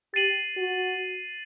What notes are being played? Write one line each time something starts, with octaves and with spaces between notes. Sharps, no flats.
G4 A6 C7 D#7 F#7
F#4